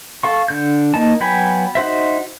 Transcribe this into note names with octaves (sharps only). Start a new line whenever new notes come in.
A4 F5 C#6
D3 G6
A#3 D#4 A5
F#3 B3 G5 G#5 B5
D#4 F#4 C5 E5